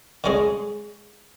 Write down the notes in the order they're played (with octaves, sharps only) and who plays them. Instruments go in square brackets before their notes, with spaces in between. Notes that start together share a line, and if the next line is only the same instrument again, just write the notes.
[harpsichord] D3 G#3 C#4 G#4